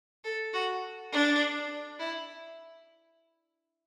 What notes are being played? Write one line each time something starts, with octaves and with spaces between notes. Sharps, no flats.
A4
F#4
D4
E4